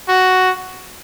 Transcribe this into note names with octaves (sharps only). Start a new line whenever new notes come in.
F#4